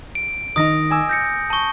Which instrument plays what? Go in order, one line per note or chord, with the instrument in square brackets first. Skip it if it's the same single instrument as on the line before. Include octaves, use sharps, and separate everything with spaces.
[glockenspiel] D7
[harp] D#3 D#4 [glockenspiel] D#6 A#6
[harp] G#5 D6 E6
[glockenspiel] G6 A#6 C#7
A5 C#6